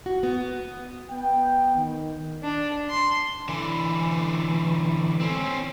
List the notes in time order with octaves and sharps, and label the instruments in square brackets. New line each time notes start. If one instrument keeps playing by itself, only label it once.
[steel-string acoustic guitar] F#4
B3
[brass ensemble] B3 G5
D#3
[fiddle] D4
C6
[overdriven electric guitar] D3 E3
C4 C#4